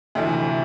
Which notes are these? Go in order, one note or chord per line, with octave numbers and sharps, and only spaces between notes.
D2 C3 E3